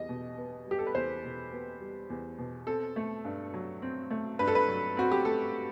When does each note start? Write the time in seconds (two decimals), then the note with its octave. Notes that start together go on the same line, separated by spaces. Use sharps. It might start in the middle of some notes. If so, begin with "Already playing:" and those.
Already playing: E2 G3 D#5
0.09 B2
0.38 B3
0.67 G3 G4
0.79 A4
0.87 B4
0.95 E2 C5
1.24 B2
1.53 B3
1.80 G3
2.10 E2
2.39 B2
2.67 C4 A4
2.96 A3
3.25 G2
3.54 F#3
3.82 C4
4.11 A3
4.39 G2 B4
4.48 A4
4.55 B4
4.68 F#3
4.97 C4 F#4
5.12 G4
5.25 A3 A4